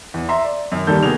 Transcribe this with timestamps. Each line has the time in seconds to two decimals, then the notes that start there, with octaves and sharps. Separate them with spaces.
0.14 E2
0.29 E5 A#5 C6
0.44 D5
0.72 F#2 D#3
0.87 D#2 D#3 G3 A#3 A4 G6
1.03 B2 A#3 G#4 F7